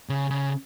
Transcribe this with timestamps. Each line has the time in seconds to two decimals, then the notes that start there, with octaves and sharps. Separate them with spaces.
0.09 C#3
0.30 C#3